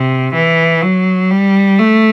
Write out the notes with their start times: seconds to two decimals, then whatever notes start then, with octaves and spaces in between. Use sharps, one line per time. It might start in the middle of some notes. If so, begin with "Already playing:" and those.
Already playing: C3
0.34 E3
0.82 F#3
1.31 G3
1.79 A3